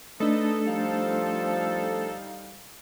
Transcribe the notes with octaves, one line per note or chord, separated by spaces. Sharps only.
A3 D4 D#4 A4 B4 D#5
F3 G3 D#4 F5